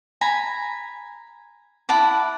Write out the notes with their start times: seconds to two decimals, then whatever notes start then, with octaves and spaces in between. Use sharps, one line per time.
0.21 G#5 A#5 B5
1.89 E4 F#5 A5 D6